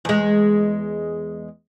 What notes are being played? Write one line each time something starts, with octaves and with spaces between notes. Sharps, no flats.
E2 G#3